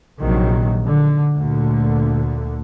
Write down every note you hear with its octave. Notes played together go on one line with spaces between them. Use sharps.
A#1 C3 D#3 F#3
D3
D2 A#2 D3